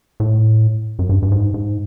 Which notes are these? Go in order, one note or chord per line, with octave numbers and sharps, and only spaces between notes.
A2
F#2
G2
G2
G#2
G#2